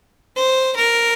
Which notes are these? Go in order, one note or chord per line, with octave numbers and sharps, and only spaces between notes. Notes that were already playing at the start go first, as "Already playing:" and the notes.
C5
A#4